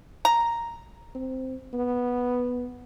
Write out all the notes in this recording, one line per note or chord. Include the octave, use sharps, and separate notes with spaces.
A#5
C4
B3